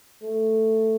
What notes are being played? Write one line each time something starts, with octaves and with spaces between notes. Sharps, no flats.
A3